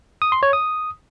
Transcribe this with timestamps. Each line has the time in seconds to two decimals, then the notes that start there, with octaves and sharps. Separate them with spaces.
0.22 D#6
0.32 C6
0.43 C#5
0.53 D#6